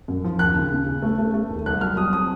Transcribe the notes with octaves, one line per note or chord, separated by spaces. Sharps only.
F#2
F3
D#2 F#6
C#3
C#3
C#3
A3
A3
A3
D#2
C2 F#6
F#3 F6
F#3 D#6
C4 D#6